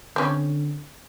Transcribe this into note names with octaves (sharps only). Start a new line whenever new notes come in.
D3 C4 C#4